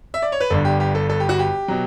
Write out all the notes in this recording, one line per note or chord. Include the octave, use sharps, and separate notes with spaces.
E5
D5
C#5
B4
G1 G2 D3 A4
G4
G4
A4
A4
G4
F#4
G4
B2 F#3